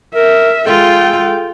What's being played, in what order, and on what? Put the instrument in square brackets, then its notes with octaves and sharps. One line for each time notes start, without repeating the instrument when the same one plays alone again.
[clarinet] A#4 [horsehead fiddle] E5
[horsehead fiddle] G#3 G5 [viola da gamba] F4 [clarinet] A4